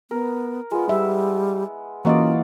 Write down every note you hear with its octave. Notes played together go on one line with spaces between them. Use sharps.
B3 A#4
G#3 B3 F4
G3 E5
E3 F#3 A#3 C#4 F4 D5 D#5